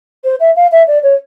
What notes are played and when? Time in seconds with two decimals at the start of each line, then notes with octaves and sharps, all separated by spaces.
0.24 C5
0.40 E5
0.56 F5
0.72 E5
0.87 D5
1.03 C#5